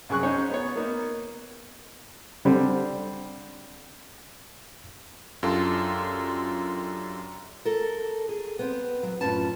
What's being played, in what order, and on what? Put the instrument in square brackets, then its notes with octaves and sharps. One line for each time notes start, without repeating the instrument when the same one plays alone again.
[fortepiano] C2 F#2 G#4 C#6 F#6
C#4 D#4 C5 C#5
B3 C#5
A#3 B3 D#4
D3 G3 C4
[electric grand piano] F#2 D4 F4 G4 A4 C6
[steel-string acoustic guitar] A4 A#4
G#4
B3 C4
F#3
F#2 A2 F3 C#4 B4 A5